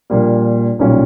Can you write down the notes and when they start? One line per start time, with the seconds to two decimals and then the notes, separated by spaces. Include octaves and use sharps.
0.10 A#1 A#2 G3 A#3
0.79 B1 A#2 G3 C#4